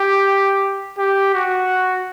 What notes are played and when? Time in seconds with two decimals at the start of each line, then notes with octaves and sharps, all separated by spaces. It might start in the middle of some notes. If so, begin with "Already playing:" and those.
Already playing: G4
0.98 G4
1.34 F#4